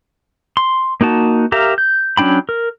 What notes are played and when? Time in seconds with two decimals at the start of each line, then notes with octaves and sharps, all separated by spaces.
0.57 C6
1.01 A#3 D#4 F#4 A5
1.52 G4 A#4 E5 F5 A#5
1.78 G6
2.17 F#3 C#4 D4 G5 B5
2.49 A#4